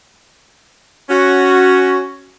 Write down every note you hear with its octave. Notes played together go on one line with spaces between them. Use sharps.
C#4 F#4